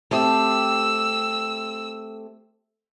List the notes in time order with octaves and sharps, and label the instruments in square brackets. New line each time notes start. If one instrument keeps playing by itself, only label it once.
[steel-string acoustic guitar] A3 C4 G4 [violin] E6